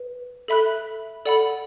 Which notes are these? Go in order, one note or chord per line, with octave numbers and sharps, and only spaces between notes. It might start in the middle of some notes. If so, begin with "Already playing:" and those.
Already playing: B4
A4 E5 B5 F#6
A4 D5 F#5 B5